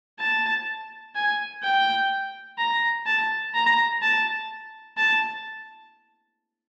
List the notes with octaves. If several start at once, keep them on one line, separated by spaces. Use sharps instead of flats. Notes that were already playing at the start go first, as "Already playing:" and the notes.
A5
G#5
G5
A#5
A5
A#5
A5
A5